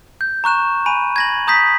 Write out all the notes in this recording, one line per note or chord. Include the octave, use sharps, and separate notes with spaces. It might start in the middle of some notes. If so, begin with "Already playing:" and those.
G6
A#5 C#6 F#6 E7
G#5 B5 D#7
G#6 A#6 F#7
A#5 D#6 G6 A#6 B6